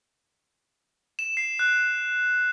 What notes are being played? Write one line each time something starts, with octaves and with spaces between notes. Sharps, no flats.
E7
C7
F#6